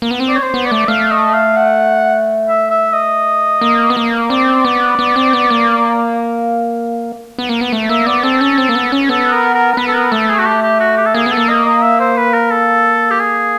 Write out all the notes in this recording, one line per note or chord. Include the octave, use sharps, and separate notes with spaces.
A#3
B3
C4
D5
C#5
C5
B3
D5
A3
A3 F5
D#5
F5
F#5
E5
E5
D#5
A#3
B3
A#3
C4 D5
B3
B3
C4
B3
A#3
B3
A#3
B3
A3
A#3 E5
B3 D5
C4 A4
C#4
C4
A#3
B3
C#4
B3 A4
A#4
A#4
A#4
B3 B4
A4
A#4
A3 A4
G#4
F#4
G4
G4
F#4
G4
A4
A#3 G#4
B3 A4
A#3
D#5
D#5
E5
C5
B4
A#4
A4
G4
G#4